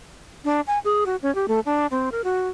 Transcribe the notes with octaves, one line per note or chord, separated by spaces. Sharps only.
D4
G#5
G#4
F#4
C#4
G4
A3
D4
C4
A#4
F#4